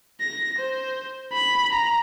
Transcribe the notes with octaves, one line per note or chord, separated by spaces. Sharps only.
A#6
C5
B5
A#5